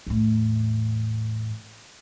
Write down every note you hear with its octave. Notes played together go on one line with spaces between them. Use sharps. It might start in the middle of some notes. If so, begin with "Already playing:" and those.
E2 A2